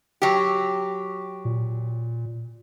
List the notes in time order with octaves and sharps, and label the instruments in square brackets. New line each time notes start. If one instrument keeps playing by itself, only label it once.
[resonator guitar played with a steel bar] F#3 G4
[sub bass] A#2